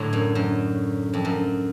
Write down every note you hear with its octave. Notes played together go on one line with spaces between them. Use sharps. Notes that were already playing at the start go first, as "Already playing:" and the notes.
Already playing: A2 D3 F#3
F#2
F#2
F2
F#2